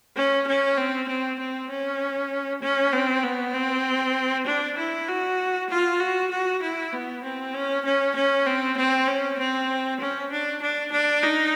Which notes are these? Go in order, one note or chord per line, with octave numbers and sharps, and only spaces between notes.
C#4
C#4
C4
C4
C4
C#4
C#4
C4
B3
C4
D4
E4
F#4
F4
F#4
F#4
E4
B3
C4
C#4
C#4
C#4
C4
C4
C#4
C4
C#4
D4
D4
D4
D#4